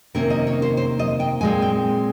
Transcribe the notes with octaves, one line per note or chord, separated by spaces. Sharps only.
C3 D#3 A#3 C#4 A#4
D#5
C#5
C5
C5
D#5
G5
A#2 G#3 C4 G#5
G5